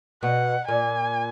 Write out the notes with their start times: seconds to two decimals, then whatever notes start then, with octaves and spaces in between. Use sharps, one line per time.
0.22 B2 F#5
0.68 A#2 G#5